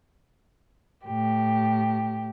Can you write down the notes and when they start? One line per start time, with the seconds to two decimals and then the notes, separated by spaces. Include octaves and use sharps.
1.07 A2 G4